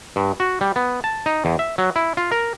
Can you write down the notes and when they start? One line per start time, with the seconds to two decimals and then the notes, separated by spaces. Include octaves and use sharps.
0.16 G2
0.40 F#4
0.61 G3
0.76 B3
1.04 A5
1.26 D#4
1.45 E2
1.59 E5
1.78 F#3
1.96 E4
2.17 F4
2.32 A#4